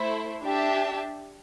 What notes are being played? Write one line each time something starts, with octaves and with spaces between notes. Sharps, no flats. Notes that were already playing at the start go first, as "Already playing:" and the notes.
Already playing: A3 E4 C5
D4 G4 E5 A5